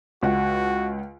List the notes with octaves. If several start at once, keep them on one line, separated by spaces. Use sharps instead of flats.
C#2 F#4 F#5